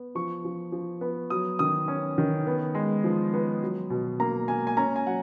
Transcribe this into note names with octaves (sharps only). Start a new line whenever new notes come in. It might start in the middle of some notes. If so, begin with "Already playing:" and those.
Already playing: B3
F3 C#6
F3
F3
B3
F#3 D#6
D#3 D#6
C#4
D#3
B3
G#3
F3
B3
F#3
B2
A#3 A#5
A#3 G#5
G#5
C#4 A#5
G#5
F#3 F#5